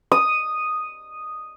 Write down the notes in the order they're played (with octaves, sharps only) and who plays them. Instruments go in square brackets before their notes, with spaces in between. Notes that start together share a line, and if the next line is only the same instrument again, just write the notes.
[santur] D#6